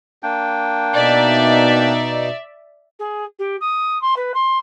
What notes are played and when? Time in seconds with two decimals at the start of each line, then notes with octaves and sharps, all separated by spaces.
0.23 A#3 D4 G5
0.95 B2 D#4 D5 E5
2.99 G#4
3.39 G4
3.60 D#6
4.01 C6
4.16 B4
4.34 C6